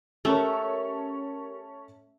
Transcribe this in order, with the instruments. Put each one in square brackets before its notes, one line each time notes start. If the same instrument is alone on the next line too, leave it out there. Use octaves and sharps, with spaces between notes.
[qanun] A3 [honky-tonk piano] C#4 A4 C#5 [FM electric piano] G4 A#4